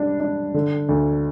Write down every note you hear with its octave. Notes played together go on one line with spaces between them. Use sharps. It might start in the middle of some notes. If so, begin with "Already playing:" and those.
Already playing: G3 D4
D4
D3
D2